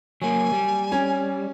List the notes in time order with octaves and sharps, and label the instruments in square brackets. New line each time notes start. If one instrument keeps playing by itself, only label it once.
[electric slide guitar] F#3 A#3 [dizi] G#5
[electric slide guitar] G3
[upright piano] C#4